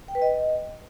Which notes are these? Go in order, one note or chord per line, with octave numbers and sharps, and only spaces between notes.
G5
B4
D#5